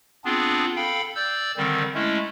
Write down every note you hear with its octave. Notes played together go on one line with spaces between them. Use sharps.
B3 C4 D4 F4 G#4
A4 F5 G5 B5
D5 E6 G6
D3 D#3 G3 C4
G#3 A3 C#4 E4